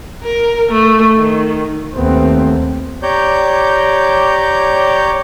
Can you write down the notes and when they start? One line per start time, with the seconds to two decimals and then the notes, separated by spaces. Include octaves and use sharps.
0.23 A#4
0.72 A3
1.16 D#3
1.93 D#2 A3 B3 C4
3.03 G4 C#5 D5 A#5 G6